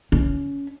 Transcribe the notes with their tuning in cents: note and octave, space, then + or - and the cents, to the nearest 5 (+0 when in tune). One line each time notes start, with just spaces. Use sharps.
C#4 +20